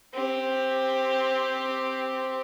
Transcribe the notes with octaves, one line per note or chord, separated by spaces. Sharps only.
C4 G4